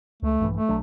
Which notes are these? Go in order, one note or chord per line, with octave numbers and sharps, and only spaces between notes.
C#2 A3
A#1 G2 E3
A3
B1 F#3 D4